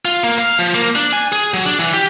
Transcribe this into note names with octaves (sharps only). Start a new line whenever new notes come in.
F4
A#3
F5
F3
A#3
D4
G#5
G#4
F#3
D4
E3
G4